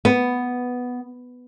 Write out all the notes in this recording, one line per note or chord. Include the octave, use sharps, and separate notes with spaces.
B3